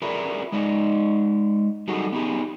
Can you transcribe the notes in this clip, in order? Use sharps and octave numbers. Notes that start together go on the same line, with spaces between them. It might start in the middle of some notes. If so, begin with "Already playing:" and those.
E4 F4 G#4 A#4 B4 D5
G#3 D#4 D5 D#5
F#3 G3 A3 D#4 F#4 G#4
B3 D#4 G4 G#4